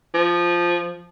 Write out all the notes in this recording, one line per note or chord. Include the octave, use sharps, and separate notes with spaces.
F3